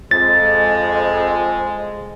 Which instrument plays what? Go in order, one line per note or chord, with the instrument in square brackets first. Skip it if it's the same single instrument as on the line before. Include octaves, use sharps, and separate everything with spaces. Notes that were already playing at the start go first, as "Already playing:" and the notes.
[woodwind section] F2 [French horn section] G#3 [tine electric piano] A6